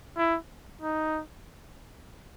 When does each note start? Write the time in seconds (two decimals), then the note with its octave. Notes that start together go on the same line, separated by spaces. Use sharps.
0.17 E4
0.82 D#4